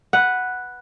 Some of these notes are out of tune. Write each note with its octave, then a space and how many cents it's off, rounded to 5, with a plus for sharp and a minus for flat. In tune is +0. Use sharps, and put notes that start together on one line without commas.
B4 +0 F#5 +0